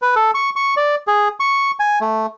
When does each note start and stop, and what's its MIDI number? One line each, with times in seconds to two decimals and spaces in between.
0.02 0.15 71
0.16 0.31 69
0.35 0.50 85
0.56 0.75 85
0.77 0.95 74
1.07 1.28 68
1.40 1.71 85
1.80 1.99 80
2.01 2.27 57